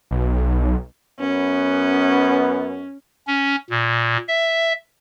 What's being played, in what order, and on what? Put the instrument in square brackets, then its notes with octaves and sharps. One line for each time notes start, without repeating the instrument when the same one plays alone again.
[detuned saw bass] B1
[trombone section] F#2 B3 [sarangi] C#4
[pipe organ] C#4
A#2
E5